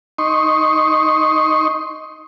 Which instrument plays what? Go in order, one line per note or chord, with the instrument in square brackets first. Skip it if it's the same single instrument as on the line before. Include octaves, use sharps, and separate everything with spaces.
[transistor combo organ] D#4 C6 C#6